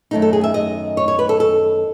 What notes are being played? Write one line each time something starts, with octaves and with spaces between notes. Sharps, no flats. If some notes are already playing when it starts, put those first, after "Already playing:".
F#2 D#3 A3 D#4
A4
G#4
E5
D#5
C#5
C#5
B4
A4
A4